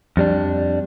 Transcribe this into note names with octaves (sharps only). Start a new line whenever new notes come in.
F2 G3 D4